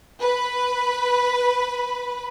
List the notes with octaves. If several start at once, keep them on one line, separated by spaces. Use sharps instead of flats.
B4 B5